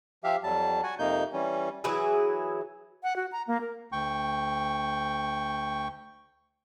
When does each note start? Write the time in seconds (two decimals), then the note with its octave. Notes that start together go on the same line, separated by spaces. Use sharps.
0.24 F3 G4 E5 F5
0.44 F2 F#3 G3 A5
0.83 F#4 F#5 G#5
0.99 F2 C3 A#3 D#4 G6
1.33 E3 G3 C#4
1.84 E3 F#3 E4 G#4
3.03 F#5
3.16 F#4
3.32 A#5
3.47 A#3
3.61 A#4
3.92 D2 G5 C#6